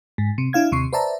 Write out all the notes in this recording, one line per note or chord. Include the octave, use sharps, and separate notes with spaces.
G#2
C3
D4 E4 F5 G#6
D#2 C3 C#6 C7
B4 C5 D5 E5 A5 A#5